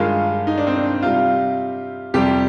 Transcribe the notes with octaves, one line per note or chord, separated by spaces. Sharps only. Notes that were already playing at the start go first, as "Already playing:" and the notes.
Already playing: G2 D#3 G#3 F4
D#4
D4
C4
D4
C3 G3 F4
F2 C3 G3 G4